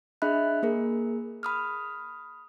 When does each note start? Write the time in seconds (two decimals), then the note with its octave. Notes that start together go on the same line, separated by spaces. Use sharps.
0.22 D4 G#4 D#5 E5 B5 F#6
0.63 A#3 G#4 A#4
1.43 B5 D#6 F6